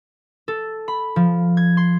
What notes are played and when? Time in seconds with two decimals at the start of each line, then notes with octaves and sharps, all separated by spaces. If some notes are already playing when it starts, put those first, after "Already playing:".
0.48 A4
0.88 B5
1.16 F3
1.57 G#6
1.77 C6